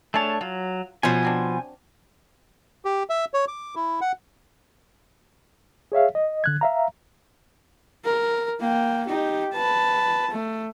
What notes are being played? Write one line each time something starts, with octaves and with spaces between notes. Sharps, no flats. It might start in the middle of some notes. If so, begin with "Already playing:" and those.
A3 D4 G#4 C#5 A5
F#3 F4
B2 F3 C#4 G#5
F#3 C4 D4
G4
E5
C#5
D6
E4
F#5
G#4 C#5 E5 F5
D#5
D3 F#6 G#6
E5 F5 A#5
A#4
A#3 G5
D#4 G4
B4 A5
A3